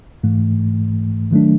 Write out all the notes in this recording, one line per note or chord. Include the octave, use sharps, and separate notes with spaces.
G#2 E3 A3
D#3 F#3 A3 D4